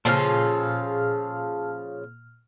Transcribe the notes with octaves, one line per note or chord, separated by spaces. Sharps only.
A#2 C#3 F3 F4 G#4 A4 F6